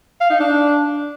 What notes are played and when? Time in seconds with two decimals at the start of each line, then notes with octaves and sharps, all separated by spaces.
0.21 F5
0.30 D#4
0.40 D4